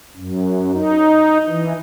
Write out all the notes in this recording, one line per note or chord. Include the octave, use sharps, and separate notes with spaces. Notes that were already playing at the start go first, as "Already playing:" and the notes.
F#2
D#4
E3